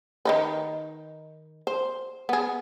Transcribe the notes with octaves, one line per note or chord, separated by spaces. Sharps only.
D#3 D#4 B4
C5
B3 G#4